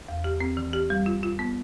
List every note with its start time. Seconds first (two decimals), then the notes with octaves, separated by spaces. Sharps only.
0.08 E2
0.24 G4
0.40 C4
0.57 E3
0.73 G4
0.90 G3
1.06 F4
1.23 F4
1.39 B3